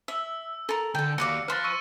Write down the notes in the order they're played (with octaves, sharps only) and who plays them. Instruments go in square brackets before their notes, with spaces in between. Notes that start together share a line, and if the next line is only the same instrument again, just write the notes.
[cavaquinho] E5 [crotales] E6
[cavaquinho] A4 A#4
[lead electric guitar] D3 [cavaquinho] A4 G5
[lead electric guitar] D#2 [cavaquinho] F#4 D5 F5 [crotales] C#7
[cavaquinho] B4 C6 [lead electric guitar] C5 F5 [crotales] F6 A6
[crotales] C#6 E6 D#7